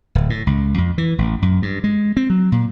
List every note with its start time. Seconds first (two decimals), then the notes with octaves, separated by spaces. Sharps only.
0.15 D1
0.30 A2
0.47 C#2
0.78 F2
0.98 E3
1.18 A1
1.42 F#2
1.62 G2
1.84 G#3
2.17 C4
2.30 F#3
2.52 A#2